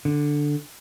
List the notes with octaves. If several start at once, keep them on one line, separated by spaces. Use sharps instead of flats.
D3